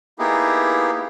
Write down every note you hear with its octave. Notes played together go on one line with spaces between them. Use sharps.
A#3 B3 D#4 E4 G4 G#4